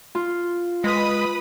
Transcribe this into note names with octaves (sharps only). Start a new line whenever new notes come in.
F4
G#3 B4 B5 D#6